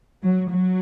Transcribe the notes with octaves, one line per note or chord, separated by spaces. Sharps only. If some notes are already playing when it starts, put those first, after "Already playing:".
F#3
F#3